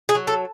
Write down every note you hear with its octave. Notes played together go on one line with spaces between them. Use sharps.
G#4
F#3
A4